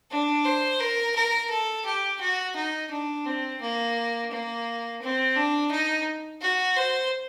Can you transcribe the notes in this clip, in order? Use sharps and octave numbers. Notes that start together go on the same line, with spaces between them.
D4
C5
A#4
A#4
A4
G4
F#4
D#4
D4
C4
A#3
A#3
C4
D4
D#4
F#4
C5